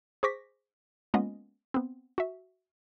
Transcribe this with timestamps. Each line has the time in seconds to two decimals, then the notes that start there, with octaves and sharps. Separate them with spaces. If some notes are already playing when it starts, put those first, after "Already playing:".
0.23 G#4 C5 C#6 D6 A#6 B6
1.14 G#3 A#3 B3 C#4 F4 D#5
1.74 B3 C4
2.18 F#4 E5